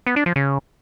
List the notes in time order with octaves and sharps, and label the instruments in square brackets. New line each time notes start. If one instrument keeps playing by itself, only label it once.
[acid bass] B3
D4
F3
C#3